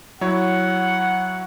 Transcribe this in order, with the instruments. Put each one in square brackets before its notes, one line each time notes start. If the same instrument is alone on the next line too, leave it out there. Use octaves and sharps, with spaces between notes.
[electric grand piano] F#3 E4 C#5 [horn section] F#5